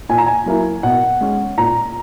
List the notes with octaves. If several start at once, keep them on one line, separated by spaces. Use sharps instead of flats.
A#2 G#5
A#5
G#5
F#3 A#3 E4
B2 F#5
G#3 C#4
A#2 A#5